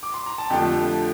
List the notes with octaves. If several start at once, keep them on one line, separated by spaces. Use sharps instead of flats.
D6
C6
A#5
A5
F2 D3 F3 A3 G4 G5